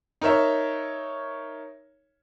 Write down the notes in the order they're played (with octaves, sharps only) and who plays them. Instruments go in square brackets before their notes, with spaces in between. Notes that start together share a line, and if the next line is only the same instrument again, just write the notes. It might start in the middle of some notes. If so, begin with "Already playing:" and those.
[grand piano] D#4 A#4 C#5 E5